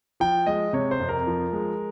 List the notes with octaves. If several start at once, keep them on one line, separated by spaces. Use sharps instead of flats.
F3 G5
G#3 D#5
C3 C#5
C5
F2
A#4
F3
G#3